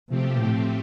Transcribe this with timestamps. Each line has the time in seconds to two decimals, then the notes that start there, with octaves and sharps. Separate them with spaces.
0.09 C3 F3 A3 C4 G4
0.38 A2